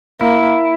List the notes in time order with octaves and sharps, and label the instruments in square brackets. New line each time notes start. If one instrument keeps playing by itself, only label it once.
[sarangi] A#3 [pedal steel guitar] E4